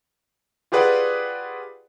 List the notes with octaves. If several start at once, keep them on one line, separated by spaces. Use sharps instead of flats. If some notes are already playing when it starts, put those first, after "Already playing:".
F4 G4 G#4 B4 D5 F#5